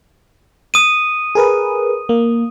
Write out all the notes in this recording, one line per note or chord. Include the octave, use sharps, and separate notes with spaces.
D#6 D#7
G#4 A#4 B4
A#3